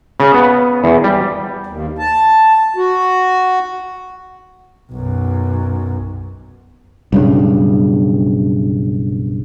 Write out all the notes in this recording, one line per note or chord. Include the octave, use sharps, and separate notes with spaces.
C#3
B3
E2
G3
D#2
A5
F#4
B1 F#2
B1 G2 C#3